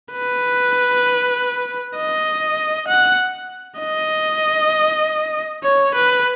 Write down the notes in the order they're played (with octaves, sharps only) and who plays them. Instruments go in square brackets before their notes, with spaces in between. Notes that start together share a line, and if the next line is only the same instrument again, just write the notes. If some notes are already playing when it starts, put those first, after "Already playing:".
[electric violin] B4
D#5
F#5
D#5
C#5
B4